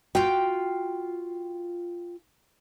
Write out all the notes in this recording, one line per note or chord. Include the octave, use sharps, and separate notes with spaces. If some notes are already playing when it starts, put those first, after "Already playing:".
F4 F#4 F#5 G5